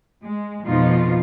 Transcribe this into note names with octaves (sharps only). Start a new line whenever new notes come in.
G#3
F2 B2 F3 D#4 F4